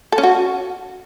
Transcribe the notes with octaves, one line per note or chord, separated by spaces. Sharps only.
A4
C#4
F#4